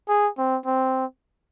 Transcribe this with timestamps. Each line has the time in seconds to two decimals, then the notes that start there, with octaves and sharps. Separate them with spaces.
0.09 G#4
0.38 C4
0.66 C4